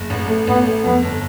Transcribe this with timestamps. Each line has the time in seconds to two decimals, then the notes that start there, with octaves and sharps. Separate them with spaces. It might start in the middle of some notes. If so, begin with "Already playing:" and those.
Already playing: F#1
0.10 A1
0.28 A3
0.47 A1 B3
0.66 A3
0.84 F2 B3
1.03 G1